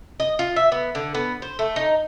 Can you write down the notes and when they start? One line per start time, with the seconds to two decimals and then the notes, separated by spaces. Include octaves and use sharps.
0.20 D#5
0.39 F4
0.56 E5
0.72 B3
0.95 D3
1.15 B3
1.42 C5
1.59 A3
1.76 D#4